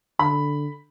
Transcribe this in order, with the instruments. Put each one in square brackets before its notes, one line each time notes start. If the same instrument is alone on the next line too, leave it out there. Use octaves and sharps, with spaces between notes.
[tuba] D3 [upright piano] B5